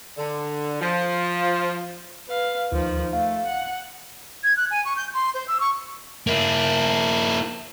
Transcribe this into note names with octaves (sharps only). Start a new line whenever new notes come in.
D3
F3
B4 F5
D2 D#3 F3
A3 F5
F#5
G#6
F#6
G#5
C#6
G6
C6
C5
E6
C#6
A#3 E4